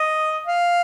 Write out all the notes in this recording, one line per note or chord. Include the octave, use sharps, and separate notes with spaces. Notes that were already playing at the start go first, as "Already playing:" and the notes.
Already playing: D#5
F5